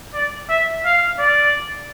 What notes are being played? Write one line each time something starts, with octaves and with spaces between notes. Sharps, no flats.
D5
E5
F5
D5